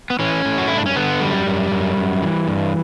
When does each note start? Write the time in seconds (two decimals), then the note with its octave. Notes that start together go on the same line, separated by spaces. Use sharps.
0.10 B3
0.19 E3 C#4
0.45 A2
0.58 F#4
0.67 G2 E4
0.77 D4
0.86 C#4
0.95 D3 B3
1.21 F#2 G3
1.47 F#2
1.72 F#2
1.97 F#2
2.22 E3
2.48 G2